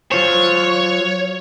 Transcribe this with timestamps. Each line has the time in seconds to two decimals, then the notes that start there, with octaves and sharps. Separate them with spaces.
0.12 F#3 F4 C5 C#5